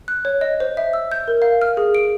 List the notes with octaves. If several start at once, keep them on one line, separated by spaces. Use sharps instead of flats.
F#6
C#5
D#5
C5
E5
E6
G6
A#4
F5
F6
G#4
D7